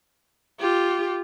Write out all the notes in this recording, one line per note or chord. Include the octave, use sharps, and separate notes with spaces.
F4 G4